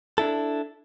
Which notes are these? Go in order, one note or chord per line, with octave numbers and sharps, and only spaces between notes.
D4 E4 A4